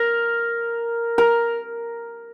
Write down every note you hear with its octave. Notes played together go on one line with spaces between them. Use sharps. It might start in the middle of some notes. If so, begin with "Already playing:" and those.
Already playing: A#4
A#4